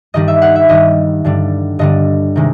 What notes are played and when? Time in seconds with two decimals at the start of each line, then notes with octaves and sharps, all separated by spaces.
0.14 G2 D#3 G3 D#5
0.28 E5
0.42 F#5
0.56 E5
0.69 G2 D#3 G3 D#5
1.24 G2 D3 G3
1.79 G2 D3 G3 D#5
2.36 C3 D#3 G#3